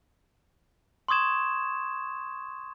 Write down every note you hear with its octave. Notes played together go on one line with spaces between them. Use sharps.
C6 C#6 D#6 G#6 E7